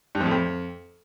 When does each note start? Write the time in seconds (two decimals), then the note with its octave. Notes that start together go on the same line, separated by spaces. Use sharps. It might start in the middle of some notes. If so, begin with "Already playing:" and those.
0.15 G2
0.20 F2
0.26 A2
0.31 F2